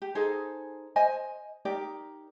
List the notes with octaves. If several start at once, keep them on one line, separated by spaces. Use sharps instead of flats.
G4
D#4 G#4 A4 C5
C5 D#5 G#5
D#4 G4 A#4 D5